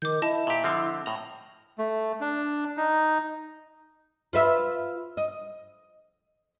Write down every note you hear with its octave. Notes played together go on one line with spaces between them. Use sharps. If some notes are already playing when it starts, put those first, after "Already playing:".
D#3 D6 G6
E4 D#5 A5
A#2 G4
D3 F3 C4
A2 A#5
A3
D4
D#4
F4 B4 E5
D#5